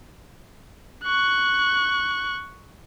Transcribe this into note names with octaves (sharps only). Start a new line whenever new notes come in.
C#6 F#6